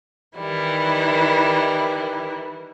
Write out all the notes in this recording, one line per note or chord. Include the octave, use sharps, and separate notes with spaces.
D#3 E3 G3 E4